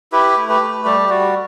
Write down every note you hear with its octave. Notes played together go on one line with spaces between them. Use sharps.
E4 G4 B4
A3
G4 B4
A3
G3 G4
G3 F#4